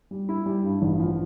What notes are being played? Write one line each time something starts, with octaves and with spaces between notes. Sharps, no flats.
G3
E4
G3
G2
A1
F3